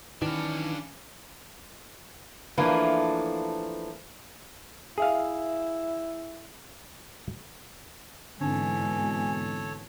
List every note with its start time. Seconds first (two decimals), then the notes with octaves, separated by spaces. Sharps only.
0.22 D#3 E3 C#4 D4 F5
2.58 E3 F3 A3 A#3 D4 B4
4.98 E4 G#4 E5 F5
8.41 G#2 B2 D3 E3 C4 A4 C#5 G#5